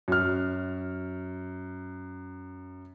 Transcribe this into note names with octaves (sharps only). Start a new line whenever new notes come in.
F#2 F6